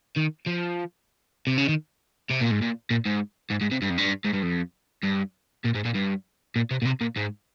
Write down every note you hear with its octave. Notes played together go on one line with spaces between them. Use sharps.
D#3
F3
C3
C#3
D#3
C3
A#2
G#2
A#2
A#2
G#2
G#2
G#2
C3
G2
F2
G2
G#2
G2
F2
G2
A#2
G#2
A#2
G2
A#2
C3
A#2
C3
A#2
G#2